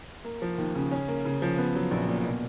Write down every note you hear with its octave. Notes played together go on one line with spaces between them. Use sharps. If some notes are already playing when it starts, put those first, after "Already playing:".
A#3
F3
D#2
C#3
C#4
A#3
C#3
F3
B3
F#3
A#1
A#2
B2